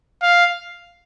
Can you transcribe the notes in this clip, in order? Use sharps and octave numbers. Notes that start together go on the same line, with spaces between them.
F5